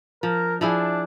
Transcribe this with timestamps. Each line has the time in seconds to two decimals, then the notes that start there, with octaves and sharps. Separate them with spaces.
0.23 F3 A#4
0.61 F3 D4 E4 G#4